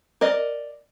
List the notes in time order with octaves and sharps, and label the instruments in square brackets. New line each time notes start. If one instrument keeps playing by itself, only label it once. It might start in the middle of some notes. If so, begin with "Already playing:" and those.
[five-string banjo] A#4 D5 D#5